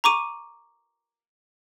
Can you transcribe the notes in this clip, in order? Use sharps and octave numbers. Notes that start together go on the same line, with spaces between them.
A#5 C#6 D6 D#7